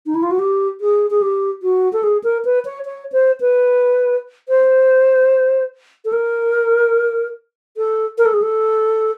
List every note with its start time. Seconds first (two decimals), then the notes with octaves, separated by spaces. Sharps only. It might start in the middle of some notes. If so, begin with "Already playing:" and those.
0.06 D#4
0.15 E4
0.23 F4
0.31 F#4
0.39 G4
0.81 G#4
1.10 G#4
1.22 G4
1.63 F#4
1.93 A4
2.03 G#4
2.24 A#4
2.45 B4
2.65 C#5
2.85 C#5
3.12 C5
3.41 B4
4.49 C5
6.05 A4
6.13 A#4
7.77 A4
8.18 A#4
8.25 A4
8.33 G#4
8.42 A4